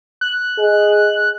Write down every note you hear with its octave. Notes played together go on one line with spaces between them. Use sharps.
F#6
G#4 D#5